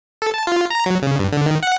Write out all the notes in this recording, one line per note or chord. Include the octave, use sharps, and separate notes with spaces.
A4
A5
F4
A#5
F#3
C#3
G2
D3
D#3
F#5